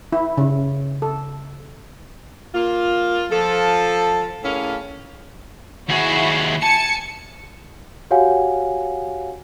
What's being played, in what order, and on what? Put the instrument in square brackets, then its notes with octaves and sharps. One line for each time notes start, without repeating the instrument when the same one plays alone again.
[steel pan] E4
C#3
A4
[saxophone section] A#3 F4
F3 A4
A2 A#3 C#4 G#4 F5
[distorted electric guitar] D#2 G#4 [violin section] E4 F#4
[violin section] G#5 C#7 [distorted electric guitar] A5
[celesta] F#4 G4 C#5 F5 F#5 G#5